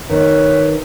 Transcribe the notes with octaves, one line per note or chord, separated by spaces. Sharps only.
D#3 D#4 B4 C#5